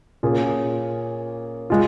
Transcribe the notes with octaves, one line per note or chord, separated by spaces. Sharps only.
A#2 A#3 C#4 F4 G#4
G#3 F4